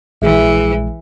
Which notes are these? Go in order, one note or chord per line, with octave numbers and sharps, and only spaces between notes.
A#1 E3 G#3 G#4 E5